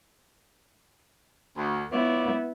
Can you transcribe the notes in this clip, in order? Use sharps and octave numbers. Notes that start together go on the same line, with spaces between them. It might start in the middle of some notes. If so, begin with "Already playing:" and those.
D2
B3 E4 F4 C#5 D5